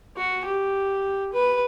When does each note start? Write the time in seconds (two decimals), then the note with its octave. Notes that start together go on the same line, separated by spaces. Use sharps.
0.17 F#4
0.45 G4
1.33 B4